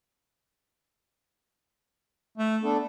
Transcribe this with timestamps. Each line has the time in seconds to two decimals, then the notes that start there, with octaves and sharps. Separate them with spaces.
2.37 A3
2.63 B3 D4 A4